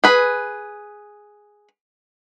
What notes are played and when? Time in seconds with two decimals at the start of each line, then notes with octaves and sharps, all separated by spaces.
0.04 G#4 B4